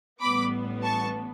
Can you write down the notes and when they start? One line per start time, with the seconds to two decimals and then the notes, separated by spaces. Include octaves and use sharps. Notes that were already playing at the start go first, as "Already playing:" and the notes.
0.21 A1 A2 G3 B3 B5 D6
0.83 A5 C#6